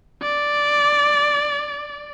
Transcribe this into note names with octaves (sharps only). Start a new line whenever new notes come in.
D5